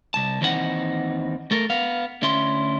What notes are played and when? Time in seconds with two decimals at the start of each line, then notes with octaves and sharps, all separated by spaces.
0.14 C2 A5
0.41 D#2 E3 C4 D#4 A#4 F#5
1.51 A3 A4 A#4
1.70 B3 F5
2.22 D2 C#4 E4 C6